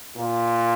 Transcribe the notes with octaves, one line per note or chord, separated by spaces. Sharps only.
A#2